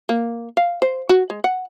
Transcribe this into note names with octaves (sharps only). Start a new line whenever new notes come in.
A#3
F5
C5
F#4
G#3
F#5